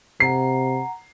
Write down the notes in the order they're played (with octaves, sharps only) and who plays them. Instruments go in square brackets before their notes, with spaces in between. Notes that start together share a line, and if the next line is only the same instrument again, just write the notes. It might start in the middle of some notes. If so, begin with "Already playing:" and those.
[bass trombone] C3 [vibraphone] F#5 A#5 [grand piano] C7